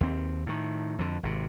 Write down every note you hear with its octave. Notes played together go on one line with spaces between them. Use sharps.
D#2 C4
A2 D#3
F2 D3
G#1 C3